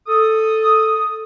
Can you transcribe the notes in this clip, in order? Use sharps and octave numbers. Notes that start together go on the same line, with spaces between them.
A4 D#6